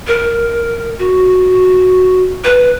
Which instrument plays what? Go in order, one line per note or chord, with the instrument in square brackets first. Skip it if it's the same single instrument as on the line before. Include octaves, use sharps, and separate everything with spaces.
[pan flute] A#4
F#4
B4